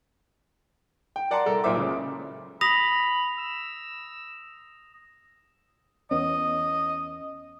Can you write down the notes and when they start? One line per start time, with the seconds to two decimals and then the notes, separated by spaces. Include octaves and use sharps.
1.16 G5
1.31 A#4 D5 F#5 A5 A#5 C6
1.45 C2 A4 A#4 A#5
1.64 B1 A#2 A#4 C5 E5 D6
1.76 C#2 C#3
2.61 B5 D#6 A#6 F7
3.38 E6
6.11 E2 B3 C#4 D#5